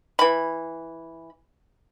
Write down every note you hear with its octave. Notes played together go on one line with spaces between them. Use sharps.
E3 B5